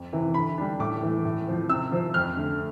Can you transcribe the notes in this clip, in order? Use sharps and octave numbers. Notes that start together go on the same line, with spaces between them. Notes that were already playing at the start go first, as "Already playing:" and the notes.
Already playing: F2
C3 E3
D3 B5
G3 D4
A2 D6
E3 A3
A2
F3 C4
C3 E6
F3 C4
F2 F6
D3 A3